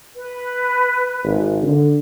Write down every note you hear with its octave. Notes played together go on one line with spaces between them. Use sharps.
B4
G#1
D3